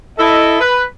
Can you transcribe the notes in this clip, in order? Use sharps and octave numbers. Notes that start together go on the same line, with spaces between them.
E4 A4 D#5
B4